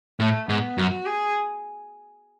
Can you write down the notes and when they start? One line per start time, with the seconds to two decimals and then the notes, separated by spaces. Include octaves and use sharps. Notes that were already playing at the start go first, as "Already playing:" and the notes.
0.20 A2 A3
0.48 G#2 B3
0.77 F#2 F#4
1.06 G#4